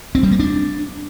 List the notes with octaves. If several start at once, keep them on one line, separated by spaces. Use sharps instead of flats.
C4
G3
A#3
D4